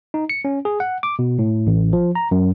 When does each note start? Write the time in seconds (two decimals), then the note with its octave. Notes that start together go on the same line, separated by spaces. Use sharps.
0.14 D#4
0.30 C#7
0.45 C#4
0.65 G#4
0.80 F#5
1.03 D6
1.19 B2
1.39 A2
1.67 A1
1.93 F3
2.15 A#5
2.31 F#2